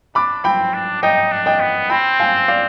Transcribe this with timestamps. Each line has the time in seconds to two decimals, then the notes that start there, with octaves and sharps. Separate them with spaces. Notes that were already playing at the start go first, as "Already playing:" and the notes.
0.15 D4 B5 D6
0.44 C4 G5 B5
0.74 D4
1.03 D#4 D#5 G5
1.32 D4
1.46 D#5 G5
1.60 B3
1.90 C4 G5 B5
2.20 F5 G#5
2.48 D5 F5